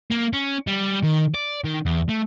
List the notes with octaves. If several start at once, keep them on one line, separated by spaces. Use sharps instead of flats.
A#3
C#4
G3
D#3
D5
D#3
E2
A3